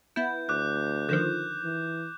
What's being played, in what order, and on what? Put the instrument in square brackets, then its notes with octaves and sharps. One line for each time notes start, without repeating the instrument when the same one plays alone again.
[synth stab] B3 E4 [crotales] G6
[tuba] D2 [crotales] D6 F#6
[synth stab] D3 D#3 F3 [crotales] G6 E7
[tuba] E3